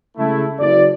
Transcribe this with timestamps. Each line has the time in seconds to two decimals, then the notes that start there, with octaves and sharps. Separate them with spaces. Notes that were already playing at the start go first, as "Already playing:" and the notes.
0.17 C#3 G#3 A3 E4
0.59 F#1 D5